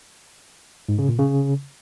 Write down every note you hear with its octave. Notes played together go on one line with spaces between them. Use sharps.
G#2
C#3
A#2
C#3